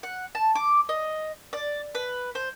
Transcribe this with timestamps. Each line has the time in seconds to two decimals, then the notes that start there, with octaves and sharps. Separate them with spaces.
0.03 F#5
0.35 A5
0.55 D6
0.89 D#5
1.53 D5
1.95 B4
2.35 C5